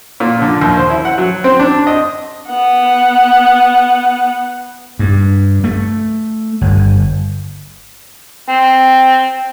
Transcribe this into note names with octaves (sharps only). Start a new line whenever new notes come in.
A#2
D3
D#2
C5
E4
F#5
F#3
C4
D4
D#5
B3 F#5
G2
A3
G1
C4